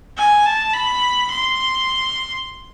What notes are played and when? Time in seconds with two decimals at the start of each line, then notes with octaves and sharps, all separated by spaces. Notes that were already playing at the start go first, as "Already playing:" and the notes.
0.17 G#5
0.46 A5
0.74 B5
1.31 C6